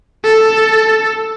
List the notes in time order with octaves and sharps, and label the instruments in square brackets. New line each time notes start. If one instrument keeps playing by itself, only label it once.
[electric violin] A4